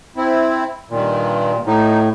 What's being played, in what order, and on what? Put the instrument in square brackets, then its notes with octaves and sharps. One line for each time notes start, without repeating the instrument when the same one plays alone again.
[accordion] C4 E4
[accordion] G2 D#3 [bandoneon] A#2
[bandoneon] A2 [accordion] D#4